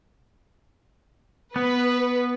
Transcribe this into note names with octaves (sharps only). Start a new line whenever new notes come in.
B3 B4